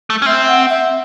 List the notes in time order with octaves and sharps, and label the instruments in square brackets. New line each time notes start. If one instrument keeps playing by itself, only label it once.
[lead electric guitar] A3
C#4
[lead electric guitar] C4 [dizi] E5
[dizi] F#5
E5